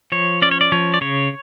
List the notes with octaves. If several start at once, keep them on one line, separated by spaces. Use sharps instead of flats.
F3 C#5
C#4 D5
C#5
D5
F3 C#5
D5
C#3 C#5